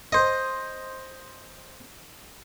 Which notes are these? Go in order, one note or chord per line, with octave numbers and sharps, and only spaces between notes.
C5 D#5